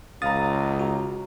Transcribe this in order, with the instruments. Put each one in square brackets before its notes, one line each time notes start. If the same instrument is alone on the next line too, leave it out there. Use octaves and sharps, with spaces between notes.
[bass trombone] C#2 [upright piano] F5 A#5 [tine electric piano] D#6 A6
[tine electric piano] F#4